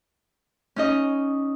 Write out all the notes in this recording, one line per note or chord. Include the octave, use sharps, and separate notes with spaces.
C#4 D#4 D#5